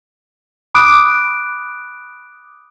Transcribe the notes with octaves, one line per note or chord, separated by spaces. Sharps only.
B5 D6 D#6 F#6 D7